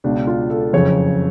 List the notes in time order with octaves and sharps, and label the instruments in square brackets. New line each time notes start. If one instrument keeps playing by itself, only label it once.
[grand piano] C#2 B2 D4
F4
A4
F#1 F2 C#3 C#5